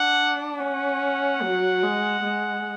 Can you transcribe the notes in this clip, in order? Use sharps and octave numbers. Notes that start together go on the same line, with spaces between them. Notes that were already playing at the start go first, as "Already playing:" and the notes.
Already playing: D4 F#5
C#4 F#5
F#3
G#3
G#3